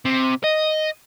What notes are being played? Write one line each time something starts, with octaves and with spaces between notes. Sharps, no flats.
C3
D#5